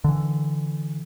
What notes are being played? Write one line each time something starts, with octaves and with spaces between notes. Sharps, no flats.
D3 E3